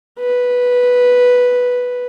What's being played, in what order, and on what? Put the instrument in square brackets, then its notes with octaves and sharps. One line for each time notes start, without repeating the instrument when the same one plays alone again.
[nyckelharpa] B4